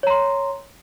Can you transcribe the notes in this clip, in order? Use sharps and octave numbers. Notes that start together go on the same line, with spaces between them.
C#5 A#5 C6